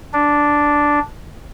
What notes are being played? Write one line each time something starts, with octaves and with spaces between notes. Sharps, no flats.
D4